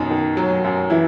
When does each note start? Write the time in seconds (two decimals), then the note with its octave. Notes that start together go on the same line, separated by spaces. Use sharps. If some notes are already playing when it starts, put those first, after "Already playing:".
Already playing: F#2 B2 D#3 D#4
0.10 D#3
0.37 F#3
0.64 F#2
0.90 E3 E4